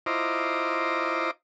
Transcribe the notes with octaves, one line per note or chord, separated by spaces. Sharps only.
E4 F4 C5 D#5 A#5 D6